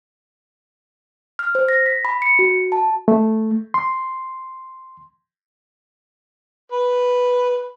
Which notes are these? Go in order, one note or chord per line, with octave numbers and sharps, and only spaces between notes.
F6
C5
A#6
B6
B5
C#7
F#4
A5
A3
C6
B4